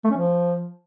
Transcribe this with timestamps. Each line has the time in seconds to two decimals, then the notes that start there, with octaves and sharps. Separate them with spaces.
0.04 A3
0.10 C#4
0.17 F3